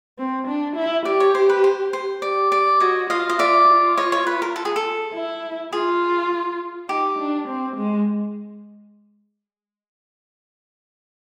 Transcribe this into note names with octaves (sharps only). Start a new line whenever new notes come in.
C4
D4
E4
G4 D5
C#5
C5
B4
C5
C5
G4 D5
D5
F#4 C#5 D#5
F4 D#5 F5
D#5
F4 D5 E5
F4
C#5 D#5
C#5
B4
A#4
A4
G#4
A4
E4
F4 G#4
D#4 G4
D4
C4
G#3